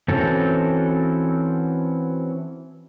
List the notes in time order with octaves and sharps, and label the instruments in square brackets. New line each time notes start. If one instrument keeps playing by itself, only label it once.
[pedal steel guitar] E3 C4 C#4 F#4 A4